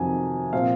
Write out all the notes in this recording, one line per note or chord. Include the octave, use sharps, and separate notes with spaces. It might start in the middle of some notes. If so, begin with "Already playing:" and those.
Already playing: F2 C3 D#3 F#3 G#5
A#2 F3 C4 F5